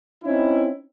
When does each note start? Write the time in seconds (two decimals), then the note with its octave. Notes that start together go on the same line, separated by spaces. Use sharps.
0.24 C4 C#4 D#4 E4